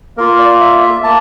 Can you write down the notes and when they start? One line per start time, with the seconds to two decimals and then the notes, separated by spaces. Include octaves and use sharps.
0.17 A#3 F4 A#4
0.39 D5
0.60 E5
0.82 E5
1.04 A#3 A5